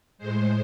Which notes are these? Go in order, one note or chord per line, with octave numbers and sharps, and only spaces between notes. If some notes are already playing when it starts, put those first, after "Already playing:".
A2 G#3 C5